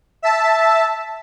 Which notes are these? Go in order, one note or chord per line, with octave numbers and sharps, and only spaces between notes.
E5 A5